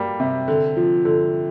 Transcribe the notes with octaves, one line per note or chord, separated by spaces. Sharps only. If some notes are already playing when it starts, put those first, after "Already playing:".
Already playing: G3 A#3
C3
D3
F3
D3